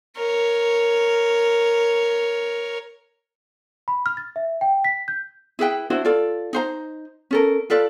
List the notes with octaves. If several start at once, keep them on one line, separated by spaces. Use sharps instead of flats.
A#4 C#5
B5
F6
A6
E5
G5
B6
G6
E4 G#4 B4 G5
D4 E4 F#4 C5
F4 A4 D5
D#4 C5 A#5
C#4 A4 A#4
F4 A4 B4 D5